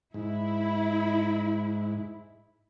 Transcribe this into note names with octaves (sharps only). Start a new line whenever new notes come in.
G#2 E4